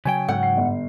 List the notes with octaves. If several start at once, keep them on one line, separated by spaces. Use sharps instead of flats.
C#3 F#3 G5 G#5
G#2 F#5
C7
G1